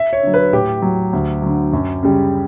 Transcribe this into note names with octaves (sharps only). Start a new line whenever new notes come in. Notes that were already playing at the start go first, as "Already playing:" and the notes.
Already playing: E5
C#5
D3 F#3
B4
A2 G4
F#3
D2
D3 F#3
F#2
C#3 G3